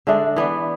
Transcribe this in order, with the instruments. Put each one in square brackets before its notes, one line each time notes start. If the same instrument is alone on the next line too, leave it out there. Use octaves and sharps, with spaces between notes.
[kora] D3 G#3 D4 [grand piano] E5
[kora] E3 B3 D4